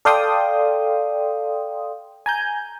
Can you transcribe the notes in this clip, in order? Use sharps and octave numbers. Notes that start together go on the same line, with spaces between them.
A4 D5 F5 G5 C6 D#6
G#5 A#5 G6